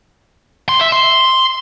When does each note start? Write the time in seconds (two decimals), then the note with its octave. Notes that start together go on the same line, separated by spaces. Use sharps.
0.69 C6
0.81 E5
0.92 C6